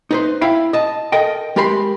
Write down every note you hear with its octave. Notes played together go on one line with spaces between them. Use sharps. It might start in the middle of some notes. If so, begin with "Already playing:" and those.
D#4 B4 C5
E4 F5 G5 B5
D#5 A5
A4 A#4 D#5 G5
G#3 G4 A#4 B5 C6